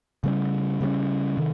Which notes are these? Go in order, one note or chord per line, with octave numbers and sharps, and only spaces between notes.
C#3 G3 A#3 C#4
C#3 G3 A#3 C#4
C3 D#3